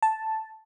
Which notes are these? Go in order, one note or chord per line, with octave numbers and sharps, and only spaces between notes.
A5